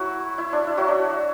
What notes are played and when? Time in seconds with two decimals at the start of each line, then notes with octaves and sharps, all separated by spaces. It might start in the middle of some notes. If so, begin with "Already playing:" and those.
Already playing: F#3 A3 E4 F#4
0.38 E4
0.53 D4
0.67 E4
0.77 F#3 F#4
0.88 D4